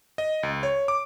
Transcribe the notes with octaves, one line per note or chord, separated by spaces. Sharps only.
D#5
C#2
C#5
D6